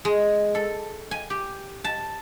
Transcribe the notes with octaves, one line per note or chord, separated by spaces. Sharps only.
G#3
A4
G#5
G4
A5